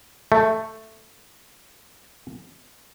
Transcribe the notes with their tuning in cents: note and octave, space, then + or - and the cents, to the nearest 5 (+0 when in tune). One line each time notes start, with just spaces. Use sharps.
A3 +5